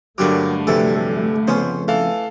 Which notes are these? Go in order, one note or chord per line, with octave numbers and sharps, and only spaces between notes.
G2 D3 F#3 G3 A3 A#3 D6
F2 C3 E3 F#3 G3 A4
F2 C#3 B3 C#4 C5
E3 A4 F5